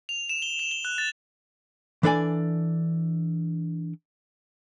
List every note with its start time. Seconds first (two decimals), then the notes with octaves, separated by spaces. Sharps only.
0.09 F7
0.29 E7
0.42 G7
0.59 F7
0.71 G7
0.85 F#6
0.98 A6
2.03 E3 D4 A4 D5 G#5